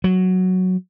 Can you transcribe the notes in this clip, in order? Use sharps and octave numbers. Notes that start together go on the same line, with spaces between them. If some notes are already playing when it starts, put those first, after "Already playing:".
F#3